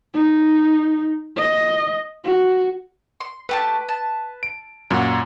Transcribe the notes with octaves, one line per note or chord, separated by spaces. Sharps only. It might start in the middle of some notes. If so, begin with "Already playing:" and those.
D#4
D#5
F#4
C6
A3 G4 B4 A5
A5
D7
F#2 A#2 C#5 F#5